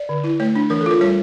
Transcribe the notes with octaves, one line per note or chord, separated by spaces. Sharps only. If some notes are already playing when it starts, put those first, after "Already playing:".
Already playing: D5
D3
E4
A3 C#5
D4
E3 A#4
A4
F4 A#4
G3 C#5